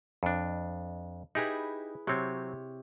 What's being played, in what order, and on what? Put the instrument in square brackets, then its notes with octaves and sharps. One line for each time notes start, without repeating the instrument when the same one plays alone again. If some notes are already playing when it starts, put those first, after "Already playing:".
[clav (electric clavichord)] F2 D4
[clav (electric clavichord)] D#4 G4 [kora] E4 G#4 B4
[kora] C3 C#5 [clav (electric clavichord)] F#3 C4